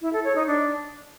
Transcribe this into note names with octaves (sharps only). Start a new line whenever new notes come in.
E4
A4
C#5
D#4
D4